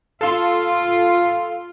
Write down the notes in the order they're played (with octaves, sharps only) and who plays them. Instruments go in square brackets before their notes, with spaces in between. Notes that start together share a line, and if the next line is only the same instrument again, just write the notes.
[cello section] F4 [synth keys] A4 F5 C6